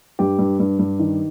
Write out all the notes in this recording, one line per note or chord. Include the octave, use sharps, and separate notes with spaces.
G2 G4
G2
G2
G2
D#3